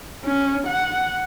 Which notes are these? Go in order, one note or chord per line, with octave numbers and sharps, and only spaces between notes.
C#4
F#5